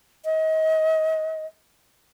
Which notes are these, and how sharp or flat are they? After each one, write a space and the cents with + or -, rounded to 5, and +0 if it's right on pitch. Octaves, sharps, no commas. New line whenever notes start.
D#5 +30